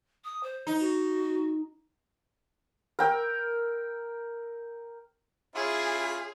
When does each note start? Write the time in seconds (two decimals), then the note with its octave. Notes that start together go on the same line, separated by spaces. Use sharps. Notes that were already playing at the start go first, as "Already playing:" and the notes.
0.24 D#6
0.43 C5
0.67 D#4
0.80 F#4
2.99 A#4 G5 E6
5.55 C#4 E4 F4 G#4